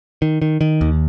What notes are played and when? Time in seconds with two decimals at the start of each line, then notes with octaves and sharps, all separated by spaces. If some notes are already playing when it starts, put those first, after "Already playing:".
0.22 D#3
0.42 D#3
0.61 D#3
0.81 D#2